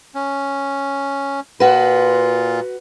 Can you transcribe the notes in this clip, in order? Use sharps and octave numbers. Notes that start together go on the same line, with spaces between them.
C#4
A#2 F4 F#4 B4